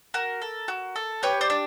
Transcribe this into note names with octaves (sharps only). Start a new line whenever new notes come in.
F#4 A#4
A4
F#4
A4
G4 B4 C#5
C5 D5
D4